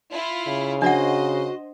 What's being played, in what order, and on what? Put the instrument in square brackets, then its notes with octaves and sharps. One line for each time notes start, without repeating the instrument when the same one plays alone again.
[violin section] E4 F4
[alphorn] C#3
[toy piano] D4 D5 F#5 [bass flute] F#4 [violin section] C5 D#5